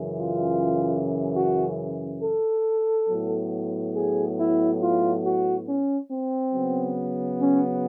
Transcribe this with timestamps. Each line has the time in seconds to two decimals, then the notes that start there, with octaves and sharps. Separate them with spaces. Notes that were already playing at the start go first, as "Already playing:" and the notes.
Already playing: F#2 C#3 E3
0.19 F4
1.35 F#4
2.21 A4
3.08 A2 F#3 B3
3.94 G#4
4.37 E4
4.80 F4
5.23 F#4
5.66 C#4
6.09 C4
6.52 C#3 F#3 B3
7.38 C#4